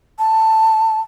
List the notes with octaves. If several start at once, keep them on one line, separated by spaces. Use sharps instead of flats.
A5